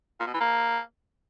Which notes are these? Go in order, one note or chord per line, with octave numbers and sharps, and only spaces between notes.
A#2
B2
E3
A#3